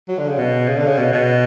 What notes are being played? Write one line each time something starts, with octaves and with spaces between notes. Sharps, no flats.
F#3
D3
C#3
B2
C#3
D3
C#3
B2
B2